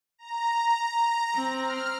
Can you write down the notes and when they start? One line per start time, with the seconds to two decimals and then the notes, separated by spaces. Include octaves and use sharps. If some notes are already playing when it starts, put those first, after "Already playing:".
0.18 A#5
1.35 C4
1.63 F6